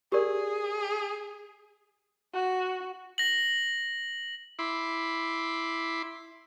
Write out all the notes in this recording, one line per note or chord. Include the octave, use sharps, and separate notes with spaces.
G4 G#4 A#4 D5
F#4
A#6 F#7
E4 B5 C6 D6